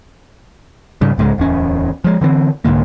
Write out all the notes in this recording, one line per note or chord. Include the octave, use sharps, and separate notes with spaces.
G#2 C#3 G3
C2 G#2 C#3 G#3
D1 E2 C#4
F3 G#3
D3 E3 A#3 C4
C2 G#2 D3 A#3